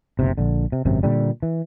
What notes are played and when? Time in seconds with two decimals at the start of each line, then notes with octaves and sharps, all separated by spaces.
0.19 F#1 B1 C3
0.38 A#1 D3
0.72 C3
0.85 G#1 F#2 C3
1.03 A#2 D3 G3
1.43 E3